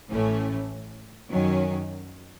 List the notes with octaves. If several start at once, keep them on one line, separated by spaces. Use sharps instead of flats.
A1 A2 E3 A3 C#4
F#2 D#3 F#3 C#4